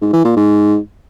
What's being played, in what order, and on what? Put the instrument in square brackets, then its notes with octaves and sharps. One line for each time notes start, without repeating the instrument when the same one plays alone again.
[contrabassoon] G#2
E3
A#2
G#2